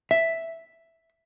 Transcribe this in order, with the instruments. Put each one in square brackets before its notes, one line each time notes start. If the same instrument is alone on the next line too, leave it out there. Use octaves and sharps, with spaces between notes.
[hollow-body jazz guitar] E5